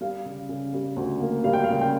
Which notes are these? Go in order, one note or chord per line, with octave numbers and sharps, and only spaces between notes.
G3 F5
C#3
C#3
G3
D2
A#3
G3 F5
G5
F5
C#3
G5